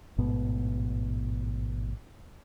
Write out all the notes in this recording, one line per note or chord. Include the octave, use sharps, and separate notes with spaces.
A1 G#2 B2 B3